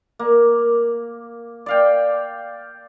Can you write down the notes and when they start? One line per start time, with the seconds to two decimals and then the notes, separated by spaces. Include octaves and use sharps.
0.19 A#3
1.66 D5 F5 G5